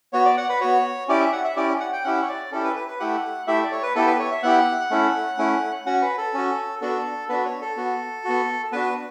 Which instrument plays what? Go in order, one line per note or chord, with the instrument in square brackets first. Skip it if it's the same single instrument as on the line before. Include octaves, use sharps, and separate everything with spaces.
[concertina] B3 F#4 C#5
D5
F#5
B4
B3 F#4 C#5
C#4 E4 G4 D5
E5
F#5
E5
C#4 E4 G4 D5
F#5
G5
C#4 E4 G4 F#5
C#5
D5
C#4 E4 G4 A4
B4
B4
B4
A3 E4 G4 F#5
A3 E4 G4 E5
D5
C#5
B4
B3 E4 G4 A4
B4
C#5
E5
B3 E4 G4 F#5
A3 C#4 E4
A3 C#4 E4
C#4 F#4 F#5
B4
A4
C#4 F#4
B3 D4 F#4 A4
B3 D4 F#4 B4
C#5
A4
B3 F#4
B3 F#4
B3 D4 F#4 B4